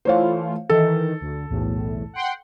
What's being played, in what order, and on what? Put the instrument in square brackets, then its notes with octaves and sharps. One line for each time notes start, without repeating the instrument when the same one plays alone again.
[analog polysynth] E3 A3 F4 [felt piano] C5 C#5 F5
[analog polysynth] D#3 E3 [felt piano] A4
[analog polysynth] D2
B1 E2 A2
F#5 G5 C6